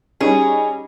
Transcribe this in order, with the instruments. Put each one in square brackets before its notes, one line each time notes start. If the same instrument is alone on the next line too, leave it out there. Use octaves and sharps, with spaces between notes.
[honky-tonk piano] G3 C#4 D#4 [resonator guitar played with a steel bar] G#4